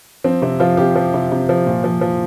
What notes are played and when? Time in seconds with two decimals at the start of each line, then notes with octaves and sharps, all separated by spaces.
0.24 F3 C4
0.42 C3 C4
0.60 F3 F4
0.77 C3 G4
0.96 F3
1.14 C3
1.31 C3
1.49 F3
1.66 A#2
1.84 F3
2.01 F3